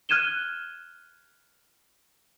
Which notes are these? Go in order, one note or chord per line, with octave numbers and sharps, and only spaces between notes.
F6 F#6 G#6 D#7 E7 G7